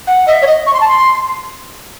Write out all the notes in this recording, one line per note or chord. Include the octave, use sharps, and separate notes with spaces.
F#5
D#5 E5
C#5
D#5
C#6
C6
A5
C6